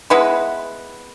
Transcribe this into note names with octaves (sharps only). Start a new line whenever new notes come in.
G#3 B3 E4 B4